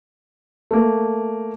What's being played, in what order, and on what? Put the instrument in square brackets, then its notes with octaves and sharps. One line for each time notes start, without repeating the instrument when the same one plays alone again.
[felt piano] A3 A#3